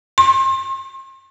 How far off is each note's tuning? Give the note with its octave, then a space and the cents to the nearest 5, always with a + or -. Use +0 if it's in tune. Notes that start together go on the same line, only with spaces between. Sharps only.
C6 +40